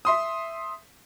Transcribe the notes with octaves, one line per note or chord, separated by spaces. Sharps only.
E5 C6 D#6